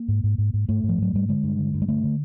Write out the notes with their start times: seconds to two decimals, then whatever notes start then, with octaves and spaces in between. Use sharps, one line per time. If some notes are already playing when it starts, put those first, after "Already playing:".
Already playing: A#3
0.08 G#2
0.24 G#2
0.38 G#2
0.54 G#2
0.69 G#2 A3
0.84 G#2
0.89 F3
0.98 G#2 F#3
1.13 G#2 G3
1.29 D3 G#3
1.44 G2
1.59 D3
1.74 G2
1.82 G#3
1.88 D3 A3
2.04 D3